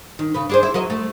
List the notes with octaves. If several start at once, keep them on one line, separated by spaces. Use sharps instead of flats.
D#3
C#3 B4
D4 G#4 C5
E4
F#3 A#4 D#5
A3